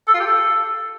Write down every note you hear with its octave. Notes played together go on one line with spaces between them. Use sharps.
A4
F4
G4
A4